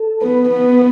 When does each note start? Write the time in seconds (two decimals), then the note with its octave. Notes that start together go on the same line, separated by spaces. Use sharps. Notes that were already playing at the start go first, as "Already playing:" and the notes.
Already playing: A4
0.21 B3 B4
0.50 B3